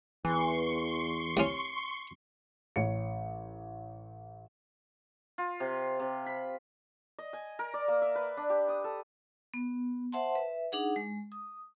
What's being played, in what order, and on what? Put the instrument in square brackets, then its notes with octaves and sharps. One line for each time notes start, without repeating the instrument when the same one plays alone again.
[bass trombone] E2 [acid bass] E3 [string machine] C6 C#6
[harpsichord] C2 C#4
[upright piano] A1 C#5 C#7
[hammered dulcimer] F4
C3
C3
B5
[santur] D#5
G#5
A#4
D5
A#3
E5
B4
D4
G4
D#6
A4
[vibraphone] B3
C5 E5 F#5 A5 C6
B4 E5
D4 D#4 G#4 F#5
G#3
D#6